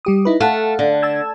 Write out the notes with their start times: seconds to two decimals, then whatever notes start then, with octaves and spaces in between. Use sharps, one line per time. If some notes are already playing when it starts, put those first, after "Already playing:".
0.05 G3 G4 D#6
0.25 D#4 E4 B4
0.40 A3 F5 F#5 A5
0.79 D3
1.02 A5 E6 G#6